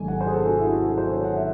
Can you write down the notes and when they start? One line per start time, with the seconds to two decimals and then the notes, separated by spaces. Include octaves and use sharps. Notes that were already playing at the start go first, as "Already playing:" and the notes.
Already playing: G#1 G#2 F#3 A3 G#5
0.08 F#5
0.21 C5
0.27 G#4
0.34 A4
0.47 F#4
0.59 E4
0.72 F#4
0.85 G#4
0.98 C5
1.11 C#5
1.24 F#5
1.37 E5